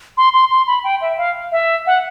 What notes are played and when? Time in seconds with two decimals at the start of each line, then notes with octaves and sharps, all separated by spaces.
0.17 C6
0.33 C6
0.51 C6
0.67 B5
0.84 G5
1.01 E5
1.18 F5
1.52 E5
1.87 F#5